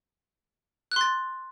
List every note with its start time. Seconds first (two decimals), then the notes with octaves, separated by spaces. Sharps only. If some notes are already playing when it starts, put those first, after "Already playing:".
0.92 F#6
0.96 C6
1.01 A6